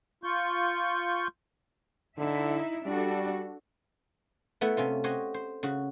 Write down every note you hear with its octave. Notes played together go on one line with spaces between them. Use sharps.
F4 C#6 G6
D3 D#4 E4 E5
G3 D4 F#4 A4
A3 B3 E4 F#5
C3 C#4 F4
F#4 G4 C5 C#5 D#5
C5
C#3 F#4